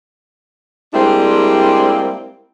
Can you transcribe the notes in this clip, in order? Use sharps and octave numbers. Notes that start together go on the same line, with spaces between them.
G3 G#3 A#3 C4 D4 E4